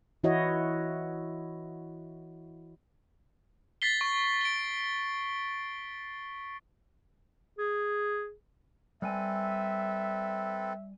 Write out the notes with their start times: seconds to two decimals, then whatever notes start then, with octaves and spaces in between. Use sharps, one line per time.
0.24 E3 E4 F#4 C#5 D#5
3.82 A6 B6 C7 G7
4.01 C#6
4.41 D7 G7
7.58 G#4
9.02 G3 C4 A4 B4 E5 G#5